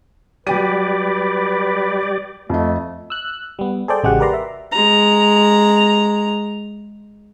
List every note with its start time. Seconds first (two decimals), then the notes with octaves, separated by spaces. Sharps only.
0.47 F#3 G3 G4 B4 D5 G5 D#7
2.49 F2 A3 D#5
3.10 E6 F#6
3.59 G3 B3
3.88 G#4 A4 C5 D5 G5
4.03 A1 C#3 G#3 F#4 G4 F#5
4.19 G4 A#4 B4 D5 A#5 C6
4.34 E5
4.72 G#3 A#5